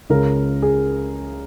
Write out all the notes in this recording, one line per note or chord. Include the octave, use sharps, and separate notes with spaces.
C#2 C#3 A#4
G#4